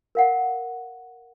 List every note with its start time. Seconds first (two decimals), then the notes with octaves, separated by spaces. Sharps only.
0.15 A#4 F5 F#5